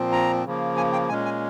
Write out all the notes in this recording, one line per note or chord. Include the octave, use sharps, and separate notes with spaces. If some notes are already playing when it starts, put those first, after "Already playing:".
Already playing: A#2 F3 C4
A#5
C#3 F3 A#3
G#5
G5
A#2 G#3 C#4 G#5
G#5